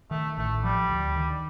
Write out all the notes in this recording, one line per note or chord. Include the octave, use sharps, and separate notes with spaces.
D#3 A3
A1 A3
F3 G3
D2
D#3